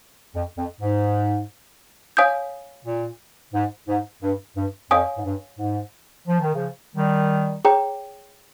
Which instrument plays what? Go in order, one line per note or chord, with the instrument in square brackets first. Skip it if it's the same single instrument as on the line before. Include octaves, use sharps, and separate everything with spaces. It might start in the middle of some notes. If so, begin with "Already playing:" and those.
[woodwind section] F2
F2
G#2
[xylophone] C#5 F5 G#5 D#6 G6
[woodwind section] A#2
G#2
G#2
G2
G2
[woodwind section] F2 [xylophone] C#5 F5 G#5 D#6
[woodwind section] G#2
G2
G#2
F3
D#3
C#3 F3
D#3 G3
[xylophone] G#4 C#5 G5 A#5